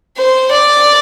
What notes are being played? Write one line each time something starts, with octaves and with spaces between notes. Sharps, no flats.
C5
D5